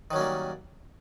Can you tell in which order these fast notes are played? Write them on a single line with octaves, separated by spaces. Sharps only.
D#3 F#3 C#4 A#3 G3